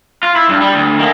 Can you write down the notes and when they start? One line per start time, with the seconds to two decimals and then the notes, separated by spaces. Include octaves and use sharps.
0.23 F4
0.36 E4
0.49 G2
0.61 G3
0.74 D2
0.99 D#3 A#3